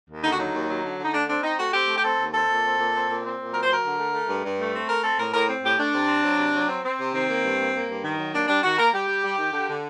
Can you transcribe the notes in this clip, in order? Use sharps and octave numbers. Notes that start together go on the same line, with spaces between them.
D#2
D3 D#4
F#4
F#3 D#4
D#2
F#3
D3
D3
D#4
A3 D4
C4 D4
C4 D#4
A3 F#4
C4 G4
A3
G4
C4 A4
D#2
C4 A4
A#2
C4
A#2
C4
A#2
C4
A#2
F#3 A#4
C5
F#3 A#4
D3
A3
A3
G2
G2
A3
C4
A3 A#4
C4 A4
A2 A#4
A2 A#4
C4
A2 G4
A3 D4
C3
C4
F#3
C3
F#3
C4
C4
C3
D#3 C4
A#3
G2
A#3
A#3
G2
D#3
F#3
A#3 D4
G3 D4
D#3 F#4
A#3 A#4
G3 G4
G3
G3
D#3
D3
D3